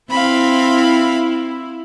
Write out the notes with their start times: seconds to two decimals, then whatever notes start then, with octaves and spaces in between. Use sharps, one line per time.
0.11 C4 E4 F5 B5